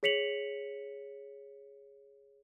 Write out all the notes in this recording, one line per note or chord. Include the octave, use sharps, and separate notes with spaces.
G#4 C#5 B6 C#7 F7 F#7